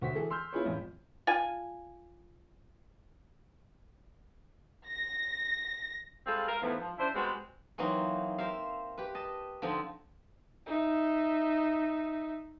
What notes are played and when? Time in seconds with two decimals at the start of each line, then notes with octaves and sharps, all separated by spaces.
0.02 D2 F#4 C5 B6
0.15 E3 G#4 A4
0.30 C6 E6 F6 G6
0.53 B3 E4 F4 G#4 B4 C#5
0.65 A1 F2
1.27 F4 G#5
4.88 A#6
6.27 G3 G#3 C4 F4 G#4 A4
6.48 A#4 F5
6.62 E2 G#2 E3 F3 A3 B3
6.80 F3
6.98 C#3 D4 E4 C5
7.15 G3 G#3 B3 C4 F#4
7.78 E3 F#3 A#3 C4 D#4
8.38 A#4 C5 E5 F5
8.98 G4 B4
9.15 D#5 A5
9.62 D3 F3 C4 D#4
10.66 D#4 E5